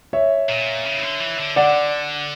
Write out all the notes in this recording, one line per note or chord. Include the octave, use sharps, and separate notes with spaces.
C#5 E5
A#2
C#3
E3
D3
E3
D3
D3 D5 F#5